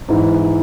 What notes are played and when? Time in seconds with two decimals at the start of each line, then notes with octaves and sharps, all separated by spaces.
0.08 G#2 E3